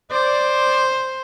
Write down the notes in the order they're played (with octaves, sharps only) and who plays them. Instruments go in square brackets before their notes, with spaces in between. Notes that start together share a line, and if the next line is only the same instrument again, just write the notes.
[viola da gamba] C5 [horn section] D5